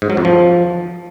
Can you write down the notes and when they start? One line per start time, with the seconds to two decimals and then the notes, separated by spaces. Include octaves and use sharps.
0.02 G#2
0.10 F#3
0.17 F2
0.25 F3